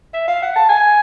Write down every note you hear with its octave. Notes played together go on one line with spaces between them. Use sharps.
E5
F5
F#5
A5
G#5